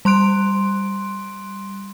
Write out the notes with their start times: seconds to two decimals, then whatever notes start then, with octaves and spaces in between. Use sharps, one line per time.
0.05 G3 C6 F#6 D7